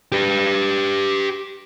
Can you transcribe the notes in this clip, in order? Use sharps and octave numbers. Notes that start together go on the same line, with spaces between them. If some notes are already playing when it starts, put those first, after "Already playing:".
G4 B4